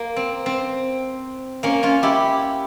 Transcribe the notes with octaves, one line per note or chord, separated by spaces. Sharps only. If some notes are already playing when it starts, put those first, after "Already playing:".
Already playing: A#3
C4
C4
A#3 C#4
C#4 F4
E4 G4